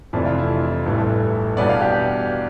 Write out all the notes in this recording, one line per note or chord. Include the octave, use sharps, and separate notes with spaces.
F2 C3 E3 A3 D4 E4
F4
E4
A1 G2 E3 A3
E2 B2 G3 B3 D4 D5
F5
G4